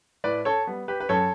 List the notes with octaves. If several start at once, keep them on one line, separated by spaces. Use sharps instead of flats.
A2 B4 D5
A4 C#5
G3 B3
G4 B4
B4
F#2 A4 C#5